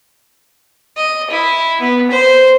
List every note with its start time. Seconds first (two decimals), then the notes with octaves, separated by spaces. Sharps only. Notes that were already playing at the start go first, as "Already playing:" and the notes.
0.97 D#5
1.30 E4
1.80 B3
2.11 C5